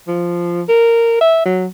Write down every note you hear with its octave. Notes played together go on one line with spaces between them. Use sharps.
F3
A#4
E5
F#3